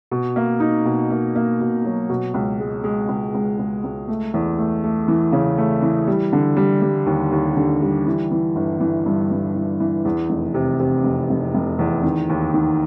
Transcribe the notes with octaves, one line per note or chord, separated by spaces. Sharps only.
B2
A#3
D#4
B2
A#3
A#3
B2
F#3
B2
C#2
G#3
G#3
C#2
C#2
C#2
C#2
A3
E2
A3
A3
E3
C#3
A3
E3
G3
D3
G3
G3
D#2
D#2
D3
G3
E3
E3
G1
E3
G2
G2
E3
E3
E2
F1
C3
C3
F1
F1
F1
E2
D#3
D#2
D#3